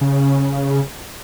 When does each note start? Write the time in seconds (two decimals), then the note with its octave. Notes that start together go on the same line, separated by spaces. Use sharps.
0.01 C#3